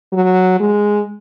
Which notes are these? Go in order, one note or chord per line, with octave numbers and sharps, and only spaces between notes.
F#3
G#3